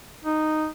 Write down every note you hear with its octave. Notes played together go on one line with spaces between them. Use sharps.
D#4